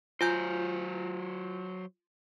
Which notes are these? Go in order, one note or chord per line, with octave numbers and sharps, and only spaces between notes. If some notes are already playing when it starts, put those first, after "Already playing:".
F#3 F4 C5 G#5 G6